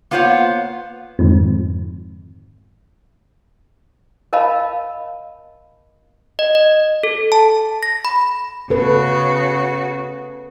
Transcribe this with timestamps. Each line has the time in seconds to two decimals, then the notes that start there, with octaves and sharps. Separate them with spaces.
0.11 A#3 B3 F4 C5 C#5 F#5
1.19 F2 G#2 D3 D#3 C4
4.33 A#4 D#5 F5 A5 B5
6.39 D#5
6.55 D#5
7.03 A4
7.32 A5
7.83 A#6
8.05 B5
8.70 C#3 F#4 A4 B4